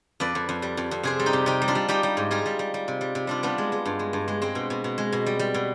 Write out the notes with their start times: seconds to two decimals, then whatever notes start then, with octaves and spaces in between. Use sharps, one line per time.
0.20 F2 B4 D5
0.35 F2
0.49 F2
0.62 G3
0.77 F2
0.91 F2
1.03 C3 G#4 C5
1.20 G3
1.26 D#4 G4
1.33 C3
1.46 C3 D#4 G4
1.62 G3
1.68 D4 F4
1.75 G3
1.88 G3 D#4 G4
2.03 G3
2.17 G#2
2.31 G3 F4 G#4
2.46 G3
2.59 G3
2.74 G3
2.88 C3
3.01 G3
3.15 C3
3.27 G3 D4 F4
3.43 G3 B3 D4
3.58 G#3
3.72 G#3
3.85 G2
3.99 G#3
4.13 G2
4.28 G#3
4.42 G#3 C4
4.55 B2
4.70 B2
4.84 B2
4.98 G#3
5.12 B2
5.26 G3
5.39 G3
5.54 B2